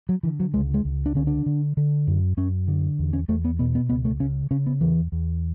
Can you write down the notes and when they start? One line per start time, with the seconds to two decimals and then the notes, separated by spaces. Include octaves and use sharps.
0.09 F#3
0.23 D3 E3
0.40 F#3
0.54 C#2 G#3
0.74 G#3
0.85 C#2
1.06 D4
1.15 D3 C#4
1.27 D4
1.46 D3
1.77 D3
2.07 F#2
2.37 F#2 C#4
2.68 D3
2.99 E2
3.13 C#4
3.28 E2 A3
3.45 B3
3.59 B2 B3
3.75 B3
3.89 C#2 B3
4.05 A3
4.20 C#3 C#4
4.51 C#3 C#4
4.67 B3
4.81 E2 E3
5.12 E2